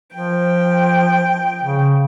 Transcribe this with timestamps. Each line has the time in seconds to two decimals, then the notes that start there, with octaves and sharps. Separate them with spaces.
0.14 F3 G5
1.64 C#3